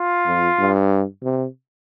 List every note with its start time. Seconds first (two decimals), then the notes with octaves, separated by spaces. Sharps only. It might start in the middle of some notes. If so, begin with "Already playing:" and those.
Already playing: F4
0.26 F2
0.59 G2
1.23 C3